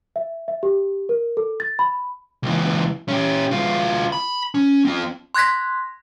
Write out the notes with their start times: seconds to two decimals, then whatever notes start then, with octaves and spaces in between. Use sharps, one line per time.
0.16 E5
0.48 E5
0.63 G4
1.09 A#4
1.37 A4
1.60 A6
1.79 B5
2.43 C#2 E3
3.09 C#4 G4
3.51 D2 F4
4.12 B5
4.55 C#4
4.85 C4 F4
5.35 C6 F#6 G#6 A#6 B6